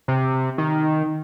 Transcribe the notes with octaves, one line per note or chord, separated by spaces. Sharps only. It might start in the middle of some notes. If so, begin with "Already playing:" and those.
C3
D#3